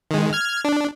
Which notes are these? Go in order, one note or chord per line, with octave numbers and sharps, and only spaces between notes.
D#3 G#3
F6 G#6
D4